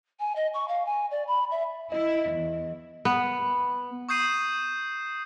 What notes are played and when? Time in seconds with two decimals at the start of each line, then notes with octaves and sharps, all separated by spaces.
0.20 G#5
0.36 D#5
0.54 C#6
0.68 F5
0.85 G#5
1.11 D5
1.27 B5
1.51 E5
1.92 E4 D#5
2.30 E2
3.05 B3
4.09 C#6 D#6 G6 C7 D#7